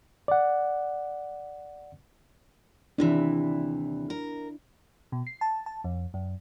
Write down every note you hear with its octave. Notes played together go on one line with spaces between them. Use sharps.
D5 F#5
D#2 C3 E3 D4 E4
A#4
B2
C7
A5
A5
F2
F#2